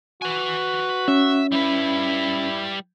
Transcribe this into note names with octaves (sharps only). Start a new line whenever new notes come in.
F#4 B4 G#5
C#4 E5
G3 E4 B4